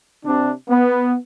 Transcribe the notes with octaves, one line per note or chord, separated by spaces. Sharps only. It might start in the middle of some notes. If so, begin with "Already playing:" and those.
C3 D4
B3